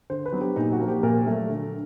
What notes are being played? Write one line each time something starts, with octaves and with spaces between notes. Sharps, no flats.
D3 C5
B4
F#3 B3
G4
A#2 D#4
F#4
F3 A#3
G4
A#2 A#4
F#3 A3
D3